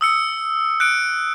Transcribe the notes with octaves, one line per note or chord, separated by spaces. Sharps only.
D#6 E6 C#7
F#6 C#7 D7